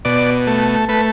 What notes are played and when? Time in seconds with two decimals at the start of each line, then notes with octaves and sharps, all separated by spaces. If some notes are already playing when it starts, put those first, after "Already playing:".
0.05 B2 D5
0.47 A3
0.89 A3 B4